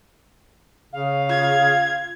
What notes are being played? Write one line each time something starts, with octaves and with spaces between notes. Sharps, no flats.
C#3 F5
F4 G#6